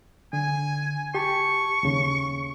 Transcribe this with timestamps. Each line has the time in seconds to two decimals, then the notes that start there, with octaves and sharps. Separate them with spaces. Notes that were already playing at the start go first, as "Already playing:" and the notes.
0.33 D3 G#5
1.15 G4 A5 C#6
1.83 D#2 C#3